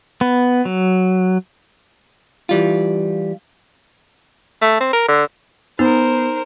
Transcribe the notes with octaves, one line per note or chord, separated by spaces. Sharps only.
B3
F#3
E3 G3 F4
A3
C4
A#4
D3
B3 D#4 A#4 C5